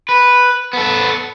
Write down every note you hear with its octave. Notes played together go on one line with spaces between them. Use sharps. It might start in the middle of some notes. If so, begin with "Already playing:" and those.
B4
B3 A4